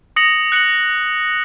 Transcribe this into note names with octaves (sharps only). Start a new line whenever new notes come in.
D#6 A#6 C#7 F#7
F#6 C#7 F#7